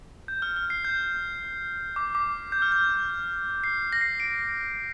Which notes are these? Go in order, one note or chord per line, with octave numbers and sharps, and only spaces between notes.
G6
F6
F6
C7
G6
D6
D6
G6
F6
G6
C7
A#6
C7
D7